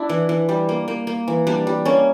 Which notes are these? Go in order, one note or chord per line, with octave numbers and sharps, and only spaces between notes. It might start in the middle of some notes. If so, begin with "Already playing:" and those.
Already playing: D4 E4
E3
E3
G3
A#3
A#3
A#3
E3
G3 D4
G3
A#3 C#4